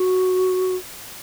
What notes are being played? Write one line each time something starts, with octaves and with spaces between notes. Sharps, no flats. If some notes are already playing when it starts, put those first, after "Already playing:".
Already playing: F#4